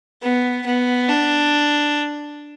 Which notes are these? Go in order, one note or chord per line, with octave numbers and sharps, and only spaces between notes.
B3
B3
D4